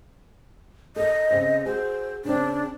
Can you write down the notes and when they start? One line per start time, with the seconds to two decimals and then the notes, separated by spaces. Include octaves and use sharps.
0.96 A4 A#4 D#5
1.31 C#3 C4 C5
1.66 F#4 G#4 C5
2.25 C#3 C4 D4